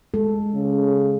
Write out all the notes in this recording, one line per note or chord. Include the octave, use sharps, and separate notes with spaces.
G#3 A4
C#3